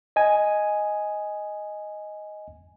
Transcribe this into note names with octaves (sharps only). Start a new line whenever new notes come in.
D#5 G#5